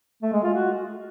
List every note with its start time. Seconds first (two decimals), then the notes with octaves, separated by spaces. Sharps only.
0.23 A3
0.33 G#3
0.43 F4
0.53 F#4